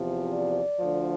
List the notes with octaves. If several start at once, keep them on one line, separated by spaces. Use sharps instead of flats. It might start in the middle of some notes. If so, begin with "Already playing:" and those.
Already playing: E2 C3 F3
D5
D2 D3 F3